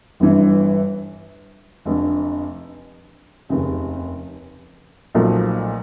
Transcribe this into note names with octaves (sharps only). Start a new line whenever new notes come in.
G1 G2 E3
F1 F2 D3
F1 D#2 C#3
B1 A#2 F3 A3